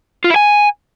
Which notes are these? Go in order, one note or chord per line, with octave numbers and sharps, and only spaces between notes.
F4
E4
G#5